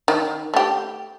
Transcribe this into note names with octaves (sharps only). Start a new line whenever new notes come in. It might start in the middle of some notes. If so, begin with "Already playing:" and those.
D#3
A3 G4